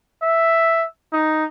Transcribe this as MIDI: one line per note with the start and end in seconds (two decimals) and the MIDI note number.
0.22 0.84 76
1.13 1.45 63